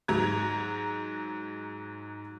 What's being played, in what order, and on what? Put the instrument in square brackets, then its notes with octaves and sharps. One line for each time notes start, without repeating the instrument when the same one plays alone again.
[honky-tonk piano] G#2 F#3 A#5 G#6